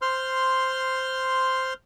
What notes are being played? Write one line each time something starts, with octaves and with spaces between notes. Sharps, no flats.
C5 C6 F6